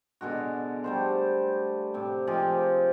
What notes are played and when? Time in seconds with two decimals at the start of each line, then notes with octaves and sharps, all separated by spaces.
0.21 B2 D3 G#3 F#4
0.84 G3 A3 C5
1.94 A2 C3
2.27 F3 G#3 G4 G#4